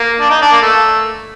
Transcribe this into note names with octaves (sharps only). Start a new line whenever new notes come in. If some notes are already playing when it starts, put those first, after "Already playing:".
Already playing: A#3
D4
D#4
D4
A#3
A3